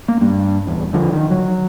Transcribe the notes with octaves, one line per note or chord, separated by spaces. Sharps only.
A#3
G2
D1 E2
D3 F3
D#3
F#3